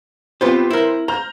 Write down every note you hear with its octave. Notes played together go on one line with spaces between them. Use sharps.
B3 C4 F4 G4 B4 C5
E4 A#4
C5 A#5 F6 G6